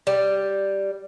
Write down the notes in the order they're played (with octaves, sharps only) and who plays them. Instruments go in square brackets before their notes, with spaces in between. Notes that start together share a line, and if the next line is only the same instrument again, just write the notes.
[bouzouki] G3